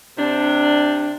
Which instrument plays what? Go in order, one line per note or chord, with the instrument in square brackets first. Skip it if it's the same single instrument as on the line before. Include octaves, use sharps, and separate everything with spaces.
[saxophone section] C3 D4